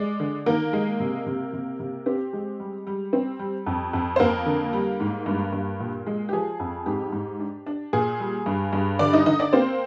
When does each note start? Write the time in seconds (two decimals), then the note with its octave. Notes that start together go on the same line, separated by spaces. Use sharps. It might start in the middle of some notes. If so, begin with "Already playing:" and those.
Already playing: G#3 D5
0.20 D3
0.46 D#3 A#3 A#4
0.73 G#3
1.00 C3
1.26 C3
1.53 C3
1.80 C3
2.06 C4 G4
2.33 G#3
2.60 G3
2.87 G3
3.13 C4
3.39 G3
3.66 F2
3.93 F2
4.16 C5
4.20 F2 A#3 A#4
4.46 D3
4.73 G3
5.00 G#2
5.26 G2
5.53 G2
5.80 A#2
6.07 G#3
6.29 G4
6.33 F3 G#4
6.60 F2
6.86 G#2 G4
7.12 G#2
7.40 D4
7.66 D4
7.93 A#2 G#4
8.20 G3
8.46 G2
8.73 G2
8.99 D3 D4 D5
9.13 D#4 D#5
9.26 D3 D#4 D#5
9.39 D4 D5
9.53 A#3 C4 C5